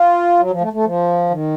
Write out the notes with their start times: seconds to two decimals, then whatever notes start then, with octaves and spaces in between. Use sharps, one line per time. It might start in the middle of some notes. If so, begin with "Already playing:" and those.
Already playing: F4
0.39 F#3
0.51 F3
0.61 A3
0.73 A3
0.85 F3
1.30 D#3